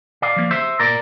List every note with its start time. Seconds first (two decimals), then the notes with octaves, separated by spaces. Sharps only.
0.22 D5 F5
0.36 F3 A#3
0.51 C5 E5
0.80 A#2 A#4 D5